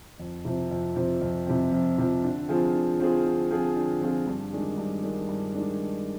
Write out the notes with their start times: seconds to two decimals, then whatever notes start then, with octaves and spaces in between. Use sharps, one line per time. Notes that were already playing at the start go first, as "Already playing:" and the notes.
0.19 F2
0.45 C3 F3 C4
0.71 F2
0.96 C3 F3 C4
1.21 F2
1.47 C3 F3 C4
1.72 F2
1.98 C3 F3 C4
2.24 D3
2.49 F3 C4 F4 G#4
2.74 D3
2.99 F3 C4 F4 G#4
3.25 D3
3.51 F3 C4 F4 G#4
3.76 D3
4.01 F3 C4 F4 G#4
4.27 G2
4.53 D#3 G#3 D4
4.78 G2
5.03 D#3 G#3 D4
5.29 G2
5.54 D#3 G#3 D4